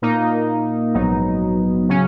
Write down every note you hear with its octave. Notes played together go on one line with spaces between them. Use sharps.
A#2 A#3 D#4
A#1 G#2 F#3 B3 D#4
C#3 F#3 C#4